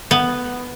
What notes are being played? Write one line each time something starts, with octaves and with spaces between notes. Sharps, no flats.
B3